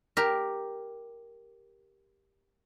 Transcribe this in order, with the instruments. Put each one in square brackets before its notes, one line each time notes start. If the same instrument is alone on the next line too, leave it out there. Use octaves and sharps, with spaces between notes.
[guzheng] G4 A#4